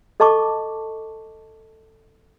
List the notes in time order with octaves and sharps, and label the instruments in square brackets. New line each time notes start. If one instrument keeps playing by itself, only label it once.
[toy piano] A4 D#5 A5 C#6 D6